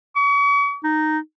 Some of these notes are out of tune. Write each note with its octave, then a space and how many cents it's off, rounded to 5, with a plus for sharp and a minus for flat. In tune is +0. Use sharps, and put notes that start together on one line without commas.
C#6 +40
D#4 -10